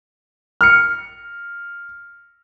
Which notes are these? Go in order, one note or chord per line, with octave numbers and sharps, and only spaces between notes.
F6 C#7